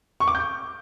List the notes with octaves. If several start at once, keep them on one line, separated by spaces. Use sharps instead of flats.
C#6
D6
G6